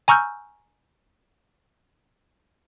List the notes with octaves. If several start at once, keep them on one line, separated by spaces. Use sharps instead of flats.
G#5 A#5 C#6 E6 F6 G6